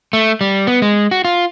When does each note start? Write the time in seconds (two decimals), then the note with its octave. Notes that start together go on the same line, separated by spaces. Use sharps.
0.13 A3
0.41 G3
0.67 B3
0.82 G#3
1.11 F#4
1.25 F4